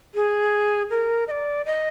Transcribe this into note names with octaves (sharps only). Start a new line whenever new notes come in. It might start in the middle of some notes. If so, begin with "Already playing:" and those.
G#4
A#4
D#5
D5
D#5